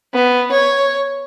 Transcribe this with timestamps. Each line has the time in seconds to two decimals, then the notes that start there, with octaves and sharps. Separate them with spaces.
0.14 B3
0.52 C#5